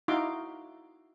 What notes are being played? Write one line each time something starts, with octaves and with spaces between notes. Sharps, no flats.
D#4 E4 F#4 F5 C6 D6